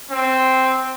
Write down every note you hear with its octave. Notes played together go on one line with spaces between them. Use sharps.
C4